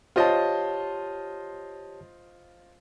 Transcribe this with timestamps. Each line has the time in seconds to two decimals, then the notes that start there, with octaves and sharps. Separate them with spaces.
0.16 F4 G4 C5 C#5 D#5 A5